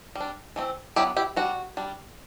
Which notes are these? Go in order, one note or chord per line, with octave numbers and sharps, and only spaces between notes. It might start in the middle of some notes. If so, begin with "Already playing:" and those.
G3 D4
E3 A3 C4
F#3 B3 D4 E4 G4
E4 G4
G3 D4 F#4
G3 D4